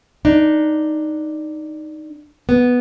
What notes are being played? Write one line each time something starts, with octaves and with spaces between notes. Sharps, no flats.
D4 D#4
B3